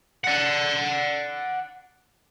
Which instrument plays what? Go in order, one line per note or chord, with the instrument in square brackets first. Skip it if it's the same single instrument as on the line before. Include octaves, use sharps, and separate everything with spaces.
[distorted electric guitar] D5 F#5